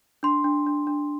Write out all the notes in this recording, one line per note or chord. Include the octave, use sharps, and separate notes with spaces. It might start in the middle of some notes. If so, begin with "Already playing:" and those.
D4 C6
D4
D4
D4